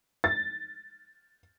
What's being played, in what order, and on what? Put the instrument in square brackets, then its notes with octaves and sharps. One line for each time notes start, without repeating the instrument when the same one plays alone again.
[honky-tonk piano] A6